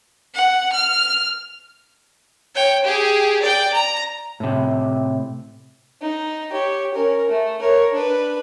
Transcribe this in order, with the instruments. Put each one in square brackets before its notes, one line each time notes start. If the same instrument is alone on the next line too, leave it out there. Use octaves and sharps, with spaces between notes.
[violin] F#5
F6
[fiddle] C#5 G5
G4 G#4
D5 G5
A#5
[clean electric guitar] A2 C3
[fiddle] D#4
G4 C#5
C#4 A#4
A3
A#4 C#5
D4 B4